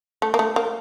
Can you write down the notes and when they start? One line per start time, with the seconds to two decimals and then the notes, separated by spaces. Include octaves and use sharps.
0.22 A3
0.34 A#3
0.39 A3
0.56 A#3